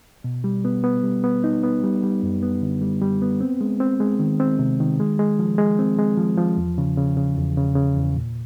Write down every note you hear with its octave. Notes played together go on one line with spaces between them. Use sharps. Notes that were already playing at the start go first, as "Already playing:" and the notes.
B2
G3
B3
B3
G3
B3
D#4
B3
G3
G3
F#2
B3
D3
G3
G3
B3
C4
G#3
C4
G#3
D#3
C4
C3
D#3
G#3
G#3
F3
G#3
C4
G#3
F3
F3
E2
C#3
C#3
C#3
E2
C#3
C#3
E2
A#2